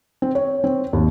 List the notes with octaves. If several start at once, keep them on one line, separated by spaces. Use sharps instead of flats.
C4
C#5
C4
D#2